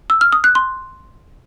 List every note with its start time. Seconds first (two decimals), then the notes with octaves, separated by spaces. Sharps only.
0.10 E6
0.21 F6
0.33 D#6
0.44 F#6
0.55 C6